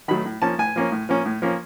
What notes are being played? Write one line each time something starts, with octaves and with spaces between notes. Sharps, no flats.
D#3 F#3 A3 B5
A2
F3 A#3 C#4 A5
A2 G#5
F3 A#3 C#4
A2
F3 A#3 C#4
A2
F3 A#3 C#4